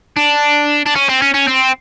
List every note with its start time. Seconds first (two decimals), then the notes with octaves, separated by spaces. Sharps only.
0.17 D4
0.86 D4
0.95 C#4
1.09 C4
1.22 C#4
1.34 C#4
1.48 C4